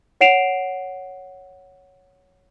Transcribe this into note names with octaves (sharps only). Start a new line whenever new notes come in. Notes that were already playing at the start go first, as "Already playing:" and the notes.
C#5 F#5 C7 D7 E7 F7